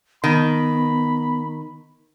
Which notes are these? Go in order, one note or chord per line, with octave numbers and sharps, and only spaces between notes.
D#3 B3 B5